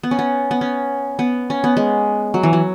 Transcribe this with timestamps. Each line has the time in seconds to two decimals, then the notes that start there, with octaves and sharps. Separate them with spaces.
0.03 B3
0.11 C#4
0.19 B3
0.51 B3
0.61 C#4
1.19 B3
1.50 C#4
1.64 B3
1.77 G#3
2.34 F#3
2.43 E3
2.53 F#3